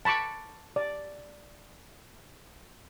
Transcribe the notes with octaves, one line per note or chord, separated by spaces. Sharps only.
A5 B5 C#6 D6
D5